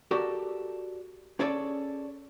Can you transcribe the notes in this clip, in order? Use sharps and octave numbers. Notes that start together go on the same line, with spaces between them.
F#4 G4 A4 A#4 D5
C#4 G#4 A4 C#5 D5